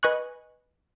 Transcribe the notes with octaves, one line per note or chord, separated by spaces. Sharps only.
B4 D#5 G#5 C#6 F#6